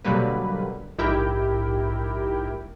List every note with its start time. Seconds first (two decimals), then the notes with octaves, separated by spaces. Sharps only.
0.04 B2 D3 F#3 G3 A#3 B4
0.98 A#1 G#2 E4 G4 A#4 G5